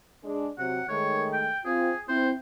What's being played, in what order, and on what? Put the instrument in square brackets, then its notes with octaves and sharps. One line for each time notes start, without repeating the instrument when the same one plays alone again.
[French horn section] G#3 D4 G#4
[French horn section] C3 F#3 [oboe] F#5
[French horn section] D#3 G#3 A3 [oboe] C#5
[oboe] G5
[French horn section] C4 F4 [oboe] G#4
[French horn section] C4 E4 [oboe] C5